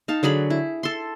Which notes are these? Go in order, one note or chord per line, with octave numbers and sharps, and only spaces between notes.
D#4 F5 A5
D3 F#3 G#4 B5
E4
A4 C6